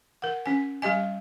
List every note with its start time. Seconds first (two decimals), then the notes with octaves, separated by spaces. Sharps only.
0.22 A#4 F#5
0.46 C#4 G#5
0.82 G3 G4 D#5 G#5